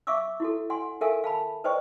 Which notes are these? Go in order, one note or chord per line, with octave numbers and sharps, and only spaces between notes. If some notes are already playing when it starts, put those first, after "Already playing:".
E5 F5 C#6 D6 E6
E4 F#4 A4
F#5 G#5 C6
G4 A4 A#4 E5 F5 G#5
F5 A5 B5
B4 C5 D5 D#5 G5 C#6